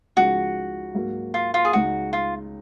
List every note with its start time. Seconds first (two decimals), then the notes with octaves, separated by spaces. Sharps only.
0.17 C#2 C#3 F3 G#3 D#4 F#4
0.95 G#2 F#3 A#3
1.34 F4
1.54 F4
1.65 G#4
1.73 C#2 C#3 G#3 D#4 F#4
2.13 F4